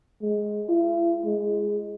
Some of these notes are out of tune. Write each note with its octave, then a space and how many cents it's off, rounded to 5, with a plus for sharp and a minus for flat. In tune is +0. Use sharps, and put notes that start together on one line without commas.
G#3 +10
E4 +45
G#3 +0